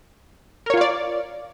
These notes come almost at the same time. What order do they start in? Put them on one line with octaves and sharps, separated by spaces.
A#4 C#5 F4 F5 D5